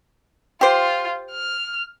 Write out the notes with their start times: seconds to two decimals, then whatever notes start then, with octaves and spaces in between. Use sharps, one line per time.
0.61 F4 G4 C5
1.32 F6